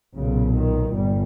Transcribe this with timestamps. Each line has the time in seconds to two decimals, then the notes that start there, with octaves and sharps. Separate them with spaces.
0.15 B1 A#2 C#3
0.54 D#3
0.94 G1 G3